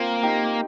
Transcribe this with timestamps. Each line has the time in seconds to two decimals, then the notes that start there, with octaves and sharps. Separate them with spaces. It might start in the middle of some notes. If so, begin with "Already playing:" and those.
Already playing: A#3 C4 F4
0.23 D#4 G4